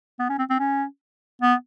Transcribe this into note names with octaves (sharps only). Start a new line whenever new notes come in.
B3
C#4
C4
C4
C#4
B3